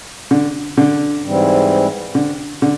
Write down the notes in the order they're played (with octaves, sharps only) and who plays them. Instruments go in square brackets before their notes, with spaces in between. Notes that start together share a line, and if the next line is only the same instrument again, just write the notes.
[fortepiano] D3
D3
[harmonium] G#2 E3 G3 C4
[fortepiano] D3
D3